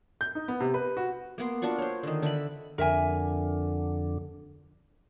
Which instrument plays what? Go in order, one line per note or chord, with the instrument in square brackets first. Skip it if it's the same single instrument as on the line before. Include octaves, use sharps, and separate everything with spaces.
[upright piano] G6
D#4
B3
C3
B4
F#4
[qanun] A#3 B3 C6
D4 F4 F#4 C#6
C5 C#5
D3 D#3
D3 E5 B5
[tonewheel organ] F2 D3 [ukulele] A#4 E5 G#5